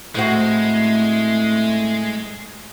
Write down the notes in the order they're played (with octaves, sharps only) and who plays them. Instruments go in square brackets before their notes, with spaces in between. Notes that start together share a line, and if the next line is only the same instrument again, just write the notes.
[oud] A2 C4 F#4 [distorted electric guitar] G#3 [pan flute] A3